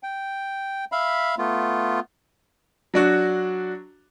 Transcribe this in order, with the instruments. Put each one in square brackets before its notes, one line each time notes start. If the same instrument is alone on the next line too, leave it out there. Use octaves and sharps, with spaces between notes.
[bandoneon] G5
E5 F5 B5
A3 B3 F4
[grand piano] F#3 D4 F#4